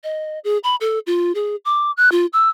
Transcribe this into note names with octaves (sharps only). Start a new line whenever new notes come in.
D#5
G#4
B5
A4
F4
G#4
D6
F#6
F4
E6